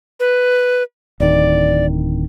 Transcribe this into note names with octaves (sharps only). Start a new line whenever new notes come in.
B4
D1 D#3 D5